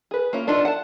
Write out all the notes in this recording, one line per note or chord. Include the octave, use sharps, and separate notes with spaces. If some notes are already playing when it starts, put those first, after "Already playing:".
G#4 B4
A#3 C#4 F4
B3 D4 D#4 F4 A4
F#5 A5